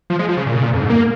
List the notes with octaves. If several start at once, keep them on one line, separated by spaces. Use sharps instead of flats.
F3
G#3
F3
C#3
A#2
C#3
A#2
F2
G#2
A#3